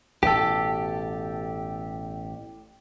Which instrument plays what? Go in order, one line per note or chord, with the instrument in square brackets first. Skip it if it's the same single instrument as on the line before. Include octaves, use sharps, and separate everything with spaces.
[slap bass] A1 B2 [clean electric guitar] G4 A4